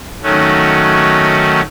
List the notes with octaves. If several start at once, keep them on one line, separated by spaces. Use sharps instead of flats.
D#3 F#3 A3 C#4 F#4